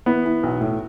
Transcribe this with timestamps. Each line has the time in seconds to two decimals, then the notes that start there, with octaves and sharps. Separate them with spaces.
0.06 E3 B3
0.25 E3
0.43 B1
0.61 A2